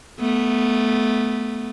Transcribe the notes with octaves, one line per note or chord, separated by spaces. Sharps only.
A3 B3